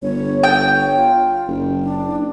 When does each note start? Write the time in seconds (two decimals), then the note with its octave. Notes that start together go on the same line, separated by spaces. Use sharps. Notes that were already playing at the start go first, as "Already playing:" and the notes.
0.03 G1 C#5
0.44 G5
0.61 C#5
0.96 F4
1.48 F#1
1.83 D4